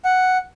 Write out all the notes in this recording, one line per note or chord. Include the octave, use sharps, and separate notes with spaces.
F#5